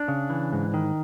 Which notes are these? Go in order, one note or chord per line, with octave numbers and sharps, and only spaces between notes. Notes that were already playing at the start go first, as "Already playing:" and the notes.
Already playing: D4
C#3
E3
G#2
D#3